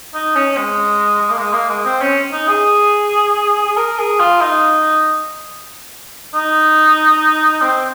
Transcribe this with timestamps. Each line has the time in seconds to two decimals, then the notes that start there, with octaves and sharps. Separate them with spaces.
0.14 D#4
0.35 C#4
0.57 G#3
1.21 G#3
1.30 A#3
1.37 G#3
1.52 A#3
1.69 G#3
1.85 C4
2.01 C#4
2.32 D#4
2.48 G#4
3.66 G#4
3.76 A#4
3.99 G#4
4.20 F4
4.41 D#4
6.34 D#4
7.61 C4